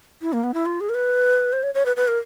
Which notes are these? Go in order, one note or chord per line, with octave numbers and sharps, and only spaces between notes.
E4
A#3
B3
E4
F4
G#4
A#4
B4
C5
C#5
C#5
B4
B4
A#4